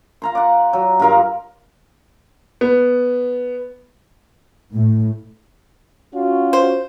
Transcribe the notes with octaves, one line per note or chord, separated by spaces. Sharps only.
F5 A#5 C6
D5 F#5
F#3
G2 F4 A#4 F5
B3
A2
C#4 F4 F#4
C5